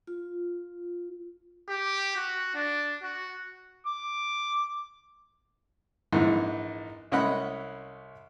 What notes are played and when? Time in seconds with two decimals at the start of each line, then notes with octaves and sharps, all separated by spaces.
0.07 F4
1.69 G4
2.16 F#4
2.55 D4
3.02 F#4
3.87 D6
6.12 A#1 G#2 E3
7.12 C2 C#4 D#5 F#5 B5 F#6